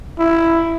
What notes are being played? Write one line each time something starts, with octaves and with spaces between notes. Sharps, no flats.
E4